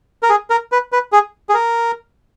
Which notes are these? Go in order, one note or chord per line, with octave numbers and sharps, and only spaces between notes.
A#4
G#4
A#4
B4
B4
G#4
G#4
A#4